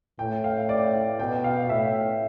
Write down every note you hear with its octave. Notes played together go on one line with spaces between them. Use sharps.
A2 G5
F5
D5
F5
B2 G5
F5
A2 E5